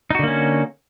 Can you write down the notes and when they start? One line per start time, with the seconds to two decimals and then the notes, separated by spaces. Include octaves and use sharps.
0.11 D#4
0.15 F#4
0.19 D3
0.23 A#3
0.28 C#4